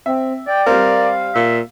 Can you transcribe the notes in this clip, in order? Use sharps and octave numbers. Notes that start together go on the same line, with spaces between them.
C4 E5
D5 G5
G3 C4 A#4 F5
A#2 E5